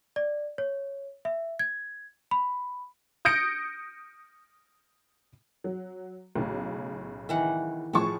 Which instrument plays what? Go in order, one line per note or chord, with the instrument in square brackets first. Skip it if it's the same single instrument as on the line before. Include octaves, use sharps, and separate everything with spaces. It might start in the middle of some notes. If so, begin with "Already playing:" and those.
[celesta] D5
C#5
E5
G#6
B5
[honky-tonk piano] D#6 G6 A#6 C#7 D7
F#3
B1 A2 C#3
[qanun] D#3 E3 F#5
[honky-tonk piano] A2 F3 C#6 [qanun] G#4 A5